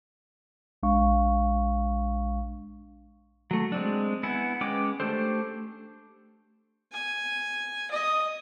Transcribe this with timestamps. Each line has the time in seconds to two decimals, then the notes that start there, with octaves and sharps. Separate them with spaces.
0.83 A#1 G#3 D4 F5 C#6
3.51 F#3 A3
3.72 G#3 C4 D4
4.23 B3 E4 F#5 G#5
4.61 G#3 C#4 B4 G5 D6
5.00 A3 D4 G4 A4 C5
6.92 G#5
7.91 D#5